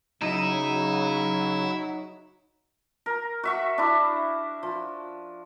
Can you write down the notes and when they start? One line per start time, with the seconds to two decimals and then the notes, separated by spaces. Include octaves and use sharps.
0.22 C#3 F#3 D#4 E4 D#5 E5
3.06 A#4
3.43 F#4 E5 C#6
3.78 D4 E4
4.63 F3